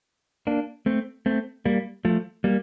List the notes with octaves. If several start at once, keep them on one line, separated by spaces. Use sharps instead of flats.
A#3 D4
A3 C4
A3 C4
G3 A#3
F3 A3
G3 A#3